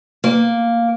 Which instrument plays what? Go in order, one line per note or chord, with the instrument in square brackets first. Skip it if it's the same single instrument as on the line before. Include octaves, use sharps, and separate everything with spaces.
[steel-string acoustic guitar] A#3